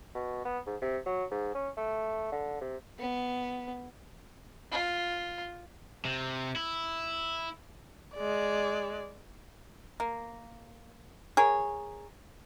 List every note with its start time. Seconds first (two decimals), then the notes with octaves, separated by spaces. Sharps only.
0.15 B2
0.45 B3
0.66 G#2
0.82 C3
1.06 F#3
1.31 G#2
1.55 C#4
1.77 A3
2.32 D3
2.61 C3
2.99 B3
4.71 F4
6.05 C3
6.56 E4
8.14 G#3 D5
10.00 A#3
11.37 G#4 A#4 C#5